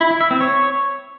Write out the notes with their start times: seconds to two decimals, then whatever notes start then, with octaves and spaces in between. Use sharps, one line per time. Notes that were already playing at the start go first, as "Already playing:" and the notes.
0.01 E4
0.11 E4
0.21 E5
0.31 C4
0.41 C#5